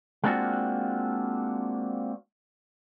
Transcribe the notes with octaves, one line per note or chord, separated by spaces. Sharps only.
G#3 A#3 C4 D4 F4 F#4